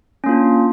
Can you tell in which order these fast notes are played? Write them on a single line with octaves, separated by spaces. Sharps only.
C#4 A#3 F4 D4